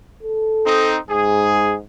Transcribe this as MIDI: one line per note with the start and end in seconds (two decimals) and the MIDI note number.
0.23 0.97 69
0.64 0.97 60
0.64 0.97 63
1.09 1.81 44
1.09 1.75 68